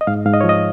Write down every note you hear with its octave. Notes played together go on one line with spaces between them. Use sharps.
D#5
G#2 F5
G#2 F5
D#5
C#5
F3
D#5